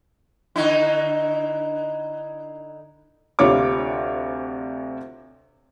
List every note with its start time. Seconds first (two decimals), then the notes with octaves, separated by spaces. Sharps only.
0.56 D3 D#4 E4
3.39 D2 C3 F4 C#5 D6